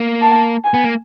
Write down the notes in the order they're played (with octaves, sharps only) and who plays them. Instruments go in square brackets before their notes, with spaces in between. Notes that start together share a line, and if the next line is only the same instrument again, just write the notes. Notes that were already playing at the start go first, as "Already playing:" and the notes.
Already playing: [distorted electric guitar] A#3
[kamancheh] A5
G#5
[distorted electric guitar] B3
A#3